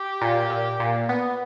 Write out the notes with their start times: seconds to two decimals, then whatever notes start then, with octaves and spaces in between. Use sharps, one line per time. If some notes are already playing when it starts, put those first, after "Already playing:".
Already playing: G4
0.21 A#2
0.50 A#2
0.80 A#2
1.09 B3